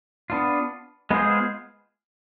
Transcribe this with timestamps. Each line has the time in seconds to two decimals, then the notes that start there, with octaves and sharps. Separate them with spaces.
0.30 B3 D4 F4
1.11 G#3 B3 F4 G#4 C5